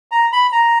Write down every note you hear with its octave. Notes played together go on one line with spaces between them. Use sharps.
A#5
B5
A#5